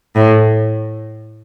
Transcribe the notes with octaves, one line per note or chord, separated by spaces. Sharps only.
A2